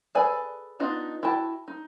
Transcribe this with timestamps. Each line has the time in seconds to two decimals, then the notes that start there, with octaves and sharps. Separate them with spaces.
0.15 G#4 A4 B4 D5 G#5
0.80 B3 D4 D#4 F4 D#5
1.23 E4 F#4 G5 A5
1.68 D#4